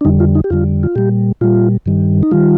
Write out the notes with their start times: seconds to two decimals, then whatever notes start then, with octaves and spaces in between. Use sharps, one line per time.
0.01 D4
0.05 F2 D3 G3 D#4
0.20 F4
0.35 D#4
0.44 G4
0.50 F2 D3 G3 F4
0.83 F4
0.96 A#2 G3 G4
1.41 A#2 G3 F4
1.86 G2 D#3 G3
2.23 D#4
2.31 D#3 G3 F4